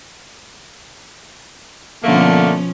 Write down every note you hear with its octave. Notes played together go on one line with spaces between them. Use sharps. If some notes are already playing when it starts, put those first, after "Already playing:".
B2 D3 F3 A3 A#3 C#4